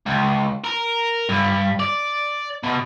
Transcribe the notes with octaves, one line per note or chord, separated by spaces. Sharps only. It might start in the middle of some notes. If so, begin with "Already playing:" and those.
C#2
A#4
G2
D5
B2